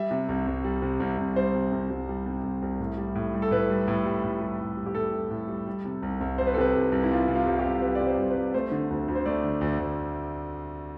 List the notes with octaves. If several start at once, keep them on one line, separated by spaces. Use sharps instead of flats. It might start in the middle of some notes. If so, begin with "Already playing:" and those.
Already playing: G3 E5
C3
C2
C2
G3
C3
C2
C2
G3 C5
C3
C2
C2
G3
C3
C2
C2
A2
G3
A2
G3
A4
A2 B4
G3
A2
G3
A2
G3
A2
G3
G4
A2 A4
G3
A2
G3
G3
C3
C2
C2
G3 C5
B4
A4
C3 B4
C2
C2
E4
G3 F4
C3
F4
C2
G4
C2
G3 B4
D5
C3
C5
C2
C2 B4
A3 C5
D3
D2
D2
C5
A3 D5
D3
D2
D2